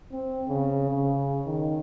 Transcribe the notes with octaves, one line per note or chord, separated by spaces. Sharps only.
C4
C#3
C#3
D#3